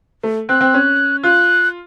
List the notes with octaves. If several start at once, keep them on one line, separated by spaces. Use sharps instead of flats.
A3
C4 F#6
C4
C#4
F4 F#6